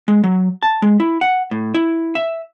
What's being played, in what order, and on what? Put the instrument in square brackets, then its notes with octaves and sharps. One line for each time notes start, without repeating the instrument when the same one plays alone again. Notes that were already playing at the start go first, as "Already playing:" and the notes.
[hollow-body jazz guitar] G#3
F#3
A5
G#3
E4
F#5
A2
E4
E5